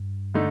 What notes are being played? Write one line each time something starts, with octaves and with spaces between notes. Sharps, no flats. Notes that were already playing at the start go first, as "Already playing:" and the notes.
Already playing: G2
D3 A3 D#4